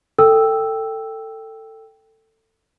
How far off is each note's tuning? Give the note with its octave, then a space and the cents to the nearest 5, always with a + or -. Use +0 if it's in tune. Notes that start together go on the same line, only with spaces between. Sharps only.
A4 +20 G5 +0 E6 +0